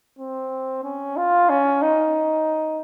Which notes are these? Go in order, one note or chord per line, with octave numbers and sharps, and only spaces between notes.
C4
C#4
F4
C#4
D#4